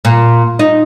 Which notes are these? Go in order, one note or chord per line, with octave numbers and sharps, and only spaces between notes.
A#2
D#4